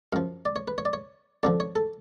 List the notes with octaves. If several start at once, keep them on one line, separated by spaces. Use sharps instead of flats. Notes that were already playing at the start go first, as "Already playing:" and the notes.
F#2 F3 F5
D5
C#5
B4
C#5
D5
C#5
F2 D3 F3 D5
C#5
A4